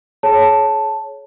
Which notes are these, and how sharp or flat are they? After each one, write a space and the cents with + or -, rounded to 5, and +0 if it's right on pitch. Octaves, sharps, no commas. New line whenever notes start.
G#4 +40 C#5 +0 A5 +0